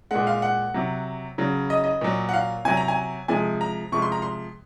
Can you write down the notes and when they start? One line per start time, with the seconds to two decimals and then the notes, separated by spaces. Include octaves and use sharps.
0.11 A#2 G#3 F#5
0.27 F5
0.42 F#5
0.74 C3 F#3
1.38 C#3 F#3
1.70 D#5
1.84 D#5
2.01 A#2 F#3
2.29 F#5
2.33 F5
2.65 C3 F#3 G#5
2.77 A#5
2.88 G#5
3.28 C3 F3 G#3 G#5
3.61 A#5
3.92 C3 F3 G#3 C#6
4.02 C6
4.12 A#5
4.22 C6